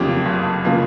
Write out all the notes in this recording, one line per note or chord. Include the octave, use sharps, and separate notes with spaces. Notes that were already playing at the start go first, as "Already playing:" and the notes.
Already playing: F#1 F2 C#3 F3 A#3 G4
F#1
C#3 F3 A#3